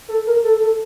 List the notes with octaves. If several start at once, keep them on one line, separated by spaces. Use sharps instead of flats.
A4
A#4
A4
A4